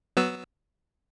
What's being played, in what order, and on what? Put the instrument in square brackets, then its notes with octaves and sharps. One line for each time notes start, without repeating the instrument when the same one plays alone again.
[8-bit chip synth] F#3 B3 E6